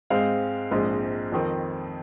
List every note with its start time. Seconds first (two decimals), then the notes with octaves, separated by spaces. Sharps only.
0.10 G#2 G#3 C4 F5
0.71 A#1 G#2 G#3 C4
1.32 F2 D#3 C4